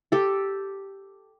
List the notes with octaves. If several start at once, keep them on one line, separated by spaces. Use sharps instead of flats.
G4 A4